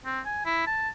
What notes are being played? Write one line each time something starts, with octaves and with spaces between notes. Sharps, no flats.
C4
G#5
E4
A5